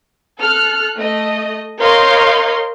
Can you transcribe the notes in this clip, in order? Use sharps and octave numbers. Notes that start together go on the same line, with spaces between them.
A4 F6 F#6
A3 D#5
A#4 C#5 D#5 F5 C6 G6